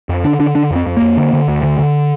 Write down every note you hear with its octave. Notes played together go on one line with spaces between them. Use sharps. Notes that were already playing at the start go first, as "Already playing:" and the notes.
F2
D3 D4
D3 D4
D3 D4
F2 C4
F2
A#3
F2
D3
D3
D2
D3
D3